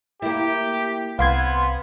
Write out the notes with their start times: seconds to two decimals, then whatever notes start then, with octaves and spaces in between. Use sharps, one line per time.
0.22 A#3 E4 G4
1.19 C2 B3 C4 F5 C6 G#6